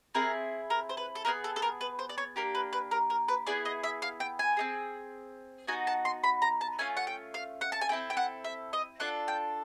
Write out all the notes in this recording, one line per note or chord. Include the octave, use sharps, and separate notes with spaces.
C4 E4 G#4 A#4
A#4
C5
B4
A4
B3 D#4 G#4 A#4
A4
A4
A#4
B4
C5
D5
C#5
A#3 D4 G4 A#4
B4
B4
A#4
A#4
B4
B3 E4 G#4 D5
D#5
E5
F5
G5
G#5
C4 D#4 G#4
B3 D#4 F#4 G#5
A5
C6
B5
A#5
A5
A3 C#4 F4 G#5
F#5
G5
F5
F#5
A5
G#5
C4 E4 A4 G5
G5
F#5
E5
D#5
D4 F4 A4 F#5
G5